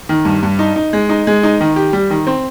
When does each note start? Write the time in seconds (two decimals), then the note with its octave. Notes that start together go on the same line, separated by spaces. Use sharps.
0.09 D#3
0.25 G2
0.43 G2
0.59 D#4
0.76 D#4
0.93 G#3
1.09 D#4
1.27 G#3
1.43 D#4
1.61 D#3
1.76 G4
1.93 G3
2.10 D#3
2.27 C4